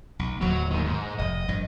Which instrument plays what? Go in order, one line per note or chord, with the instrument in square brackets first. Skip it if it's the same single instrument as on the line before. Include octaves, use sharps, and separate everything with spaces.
[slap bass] B1
[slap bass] D1 D#2 [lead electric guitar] F#3
[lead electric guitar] D#3 A#3
G#2
[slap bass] F1 [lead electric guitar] D#5
[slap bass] G#1 G2 F3